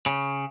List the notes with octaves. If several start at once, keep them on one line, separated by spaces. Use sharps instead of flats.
C#3